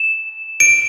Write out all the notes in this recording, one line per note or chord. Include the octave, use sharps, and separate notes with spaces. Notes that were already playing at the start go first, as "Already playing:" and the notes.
Already playing: E7
D7